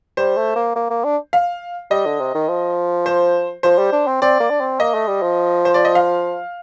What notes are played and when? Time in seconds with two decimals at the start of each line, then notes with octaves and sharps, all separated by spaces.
0.17 G3 C5
0.37 A3
0.56 A#3
0.76 A#3
0.90 A#3
1.04 D4
1.33 F5
1.91 G3 D#5
2.06 D3
2.20 C3
2.35 D#3
2.49 F3
3.06 C5
3.63 F3 C5
3.78 G3
3.92 D4
4.07 C4
4.22 C4 D5
4.40 A#3
4.50 D4
4.61 C4
4.80 A#3 D#5
4.94 A3
5.08 G3
5.22 F3
5.65 C5
5.74 D5
5.85 D#5
5.95 F5